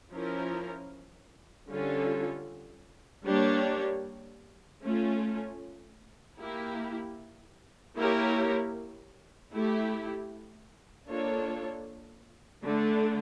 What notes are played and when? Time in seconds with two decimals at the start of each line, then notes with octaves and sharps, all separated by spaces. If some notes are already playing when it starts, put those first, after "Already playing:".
0.13 F3 C#4 E4 A#4
1.70 D3 G3 C#4 F4 A4
3.26 G3 A#3 D4 G4 C#5
4.82 A3 C#4 F4
6.38 A#3 E4 G4
7.96 A#3 E4 G4 A#4 C#5
9.52 A3 E4 G4
11.09 A#3 D4 F4 A4 C#5
12.65 D3 A3 D4